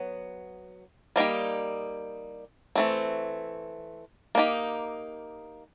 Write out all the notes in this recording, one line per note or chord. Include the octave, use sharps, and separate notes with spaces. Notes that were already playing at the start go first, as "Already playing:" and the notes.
Already playing: F#3 B3
G3 A#3 D#4 G4
E3 A3 C4
A#3 D#4 G4